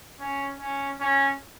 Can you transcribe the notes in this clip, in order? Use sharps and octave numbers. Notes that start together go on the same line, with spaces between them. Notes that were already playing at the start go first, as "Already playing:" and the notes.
C#4
C#4
C#4